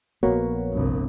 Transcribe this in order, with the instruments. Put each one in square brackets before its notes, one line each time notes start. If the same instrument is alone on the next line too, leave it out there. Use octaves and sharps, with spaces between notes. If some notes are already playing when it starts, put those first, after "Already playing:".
[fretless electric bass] A#1 B3 [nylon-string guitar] A#3 [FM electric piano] F#4 B4 C#5
[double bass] G1 C2